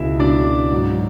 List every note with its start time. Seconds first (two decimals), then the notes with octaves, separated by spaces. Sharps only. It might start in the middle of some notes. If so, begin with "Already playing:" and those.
Already playing: C#2 B2 G#3 E4 E5
0.19 C#2 B2 G#3 D4 D5
0.71 G#2 F#3